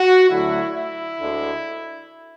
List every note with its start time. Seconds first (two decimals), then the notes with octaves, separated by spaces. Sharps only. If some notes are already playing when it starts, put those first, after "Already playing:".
Already playing: F#4
0.28 D2 D3 F#3 A3 E4
0.74 E4
1.20 D2 D3 G#3